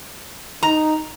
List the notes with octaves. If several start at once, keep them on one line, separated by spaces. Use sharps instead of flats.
D#4 A#5